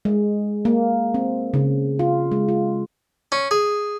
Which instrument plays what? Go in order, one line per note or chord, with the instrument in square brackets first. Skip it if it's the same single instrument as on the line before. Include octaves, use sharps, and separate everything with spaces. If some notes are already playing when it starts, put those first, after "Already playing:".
[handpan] G#3
A#3
C4
C#3
F4
G#3
F4
[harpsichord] C#4
G#4